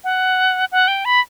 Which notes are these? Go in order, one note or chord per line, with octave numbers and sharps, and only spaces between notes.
F#5
F#5
G5
B5